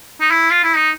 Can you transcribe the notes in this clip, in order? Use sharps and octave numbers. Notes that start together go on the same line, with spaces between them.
D#4
E4
F4
E4
D#4